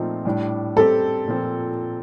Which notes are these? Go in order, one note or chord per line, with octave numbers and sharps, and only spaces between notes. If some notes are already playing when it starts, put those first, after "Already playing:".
Already playing: A#2 F3 A3 C4 D#4
A2 G3 D4
G3 C4 G4 A4
A#2 F3 C4